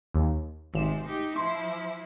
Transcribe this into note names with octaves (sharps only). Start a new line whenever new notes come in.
D#2
G#1 G#2 C3 E7
D#4 G4
F3 E4 C6